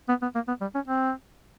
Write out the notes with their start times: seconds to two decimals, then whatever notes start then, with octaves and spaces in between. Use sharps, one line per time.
0.09 B3
0.22 B3
0.35 A#3
0.48 B3
0.61 G3
0.75 C#4
0.88 C4